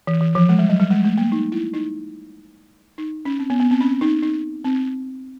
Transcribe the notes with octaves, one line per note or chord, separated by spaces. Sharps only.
E3
E3
F3
G#3
G3
F#3
G3
G#3
A3
A#3
D#4
E4
D#4
D#4
C#4
C4
B3
B3
C4
C#4
D#4
D#4
C4